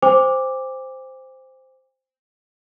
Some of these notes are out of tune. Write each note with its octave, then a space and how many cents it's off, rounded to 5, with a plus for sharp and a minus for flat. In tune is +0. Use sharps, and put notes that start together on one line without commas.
C5 -5 G5 +45 D6 +0